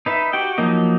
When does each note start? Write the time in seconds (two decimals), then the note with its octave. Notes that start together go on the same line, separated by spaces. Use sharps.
0.06 D#4 B4 E5
0.33 F#4 G4 G5
0.58 F3 F#3 A#3 D#4 D#5